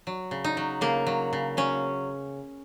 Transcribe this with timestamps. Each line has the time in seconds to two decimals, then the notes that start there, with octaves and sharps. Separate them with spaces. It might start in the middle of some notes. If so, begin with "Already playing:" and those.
0.07 F#3
0.31 C#3
0.44 D#4
0.57 F#3
0.81 C#3 A#3
1.07 F#3
1.33 C#3
1.57 F#3 C#4